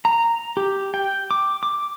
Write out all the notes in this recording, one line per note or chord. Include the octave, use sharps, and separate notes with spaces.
A#5
G4
G5
D6
D6